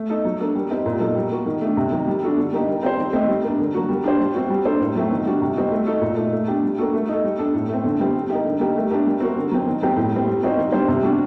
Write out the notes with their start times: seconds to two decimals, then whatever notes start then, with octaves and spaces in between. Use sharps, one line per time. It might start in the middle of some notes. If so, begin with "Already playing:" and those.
Already playing: A3
0.10 D#4 A4
0.25 F#3
0.40 A#3 D4 A4
0.55 G3
0.71 C4 D#4 G4
0.86 A#2
1.00 F#3 A#3 D#4 A4
1.15 G3
1.31 A#3 F#4
1.46 D#3
1.61 A3 D4
1.77 C3
1.92 D#3 F#3
2.07 G3
2.23 D4 F#4 A4
2.37 D3
2.52 G3 A#3 D#4 G4
2.67 G3
2.83 C4 G4 C5
2.97 D#3
3.13 A3 C4 D#4
3.28 G3
3.44 A#3 D4
3.59 D3
3.74 F#3 A#3 F#4
3.89 G3
4.04 D4 G4 C5
4.20 G3
4.34 C4 F#4
4.50 G3
4.65 A#3 D4 A4 C5
4.80 A2
4.95 F#3 A3 C4 F#4
5.11 D#3
5.26 G3 D4 F#4
5.42 C3
5.56 G3 C4 D#4 F#4
5.71 A3
5.87 D#4 F#4 A4
6.02 A#2
6.16 A3 D#4
6.32 A3
6.48 D4 G4
6.63 G3
6.78 A#3 D4 F#4 A4
6.93 A3
7.08 D#4 A4
7.24 G3
7.39 D4 A4
7.54 A2
7.68 A3 C4
7.84 D3
8.00 G3 C4 G4
8.15 G3
8.30 A#3 D#4 G4
8.44 D3
8.60 G3 A#3 D#4 G4
8.76 A3
8.91 D4 G4 A#4
9.06 G3
9.20 C4 F#4 A#4
9.36 D3
9.52 F#3 C4
9.66 D#3
9.82 F#3 C4 G4
9.96 A2
10.12 G3 C4
10.27 G3
10.43 C4 D#4 F#4 C5
10.57 D#3
10.72 G3 D4 G4 C5
10.88 C3
11.03 G3 D4 F#4